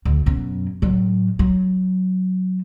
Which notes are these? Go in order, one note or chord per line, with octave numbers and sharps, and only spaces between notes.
D2
F#2 B2
A2 F#3
F#3